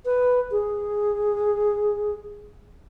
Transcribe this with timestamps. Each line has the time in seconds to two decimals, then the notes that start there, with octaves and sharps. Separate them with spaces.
0.05 B4
0.51 G#4